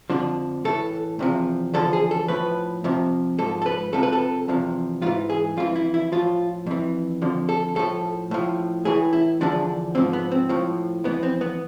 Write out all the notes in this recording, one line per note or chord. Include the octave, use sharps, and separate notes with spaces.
F2 D3 F3 D4
A2 E3 A4
E2 C3 F3
E2 D3 F3 A4
G#4
A4
A2 F3 B4
F2 C3 F3
G#2 F3 A4
A4
B4
F2 C3 F3 A4
B4
A4
E2 C3 F3
G#2 E3 F4
G#4
F2 E3 F4
E4
E4
A2 F3 F4
F2 E3
F2 D3 F3
A4
A2 F3 A4
A2 F3
A2 E3 G#4
E4
E2 D3 F3 D4
G#2 F3 C4
B3
C4
A2 F3
F2 E3 B3
C4
B3